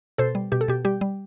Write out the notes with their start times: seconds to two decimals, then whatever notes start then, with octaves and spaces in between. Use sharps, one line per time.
0.18 B2 A4 C5
0.35 G3
0.52 B2 G4
0.61 A4
0.68 B2 G4
0.85 G3 G4
1.01 G3